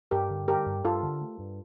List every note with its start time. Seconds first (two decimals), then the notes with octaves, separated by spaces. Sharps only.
0.11 G2 G4 A#4
0.30 D3
0.48 G3 G4 A#4
0.66 G2
0.85 G2 F4 A4
1.03 D3
1.22 A3
1.39 G2